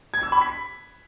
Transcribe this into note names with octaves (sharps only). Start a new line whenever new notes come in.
G#6
E6
B5
B6